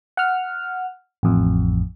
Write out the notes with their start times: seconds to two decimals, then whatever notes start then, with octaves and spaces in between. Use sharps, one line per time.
0.17 F#5 F6
1.23 A1 F2